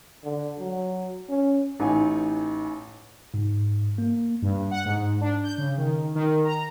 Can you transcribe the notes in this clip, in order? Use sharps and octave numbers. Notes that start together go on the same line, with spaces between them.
D3
F#3
C#4
A1 D#4 G#5
G#2
A#3
G2
F#5
G#2
D4
G6
C#3
D#3
D#3
A#5